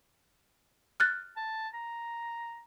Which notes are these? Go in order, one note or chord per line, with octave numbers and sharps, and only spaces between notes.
F6 F#6 A6
A5
A#5